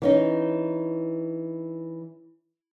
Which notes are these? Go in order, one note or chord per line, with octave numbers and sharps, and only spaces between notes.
E3 C#4 D#4